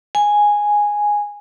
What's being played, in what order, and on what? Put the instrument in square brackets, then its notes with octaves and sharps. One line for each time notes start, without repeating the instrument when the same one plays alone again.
[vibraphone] G#5